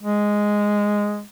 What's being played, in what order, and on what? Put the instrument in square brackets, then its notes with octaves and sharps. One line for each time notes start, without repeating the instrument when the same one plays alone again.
[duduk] G#3